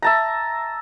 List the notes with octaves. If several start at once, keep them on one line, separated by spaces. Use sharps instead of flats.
E5 A5 A#5